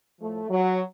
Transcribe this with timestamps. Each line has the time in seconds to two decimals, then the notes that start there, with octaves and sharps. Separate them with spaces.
0.20 A2 F3 A3
0.48 F#3